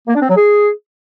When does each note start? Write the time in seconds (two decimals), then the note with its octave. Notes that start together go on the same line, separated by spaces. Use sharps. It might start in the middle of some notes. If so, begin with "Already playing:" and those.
0.07 A#3
0.14 D4
0.21 C4
0.28 F#3
0.35 G#4